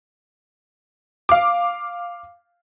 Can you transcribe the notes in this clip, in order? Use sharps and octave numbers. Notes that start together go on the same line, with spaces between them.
F5 D6